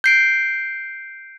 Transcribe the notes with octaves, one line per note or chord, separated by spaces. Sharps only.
G6 C7 D7